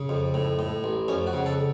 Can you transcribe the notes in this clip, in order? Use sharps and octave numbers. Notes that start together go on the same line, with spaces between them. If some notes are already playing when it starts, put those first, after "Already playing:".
Already playing: C#3
F2
A2
A2
A1
F2 C#4
F#4
C#3
A4